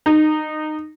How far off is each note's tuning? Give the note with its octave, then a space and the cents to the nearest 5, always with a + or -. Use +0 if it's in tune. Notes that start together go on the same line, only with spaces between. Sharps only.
D#4 -20